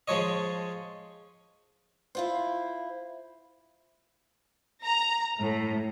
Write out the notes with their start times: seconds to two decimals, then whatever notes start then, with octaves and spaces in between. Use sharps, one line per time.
0.08 F3 G#3 C#5 D#5
2.15 E4 F4 C5
4.85 A#5
5.39 A2